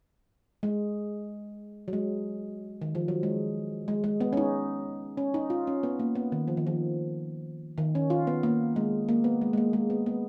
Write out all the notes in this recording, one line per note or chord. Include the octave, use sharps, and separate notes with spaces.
G#3
F#3
G#3
D#3
F3
F#3
G#3
G#3
G#3
B3
C#4
D#4
C#4
D#4
F4
C#4
B3
A#3
B3
D#3
F3
D#3
F3
D#3
C#4
F4
B3
A#3
G#3
A#3
B3
G#3
G#3
A#3
G#3
B3
B3